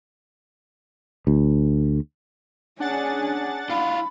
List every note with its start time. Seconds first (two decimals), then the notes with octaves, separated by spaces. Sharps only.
1.27 D2
2.80 C#4 D4 G#4 F#5 A6
3.70 E4 F4 F5 B5